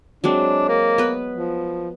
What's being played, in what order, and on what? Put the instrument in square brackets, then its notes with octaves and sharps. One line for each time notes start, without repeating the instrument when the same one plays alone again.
[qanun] F#3 G#3 C4 [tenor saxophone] D4
[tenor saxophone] A#3
[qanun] B3 B4
[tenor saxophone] F3